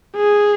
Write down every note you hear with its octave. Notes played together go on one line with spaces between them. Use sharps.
G#4